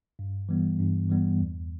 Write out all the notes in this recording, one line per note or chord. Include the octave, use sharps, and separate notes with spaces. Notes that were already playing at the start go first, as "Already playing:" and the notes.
G2
E3 G3 B3
G2
E3 G3 B3
E2